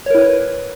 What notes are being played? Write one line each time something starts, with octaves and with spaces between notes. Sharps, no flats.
E4 A#4 B4 C#5